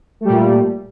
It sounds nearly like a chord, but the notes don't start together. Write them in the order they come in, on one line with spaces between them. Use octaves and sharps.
A3 G3 A#2